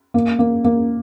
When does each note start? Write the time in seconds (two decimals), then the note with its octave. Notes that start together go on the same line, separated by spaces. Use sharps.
0.14 A#3
0.39 A#3
0.64 A#3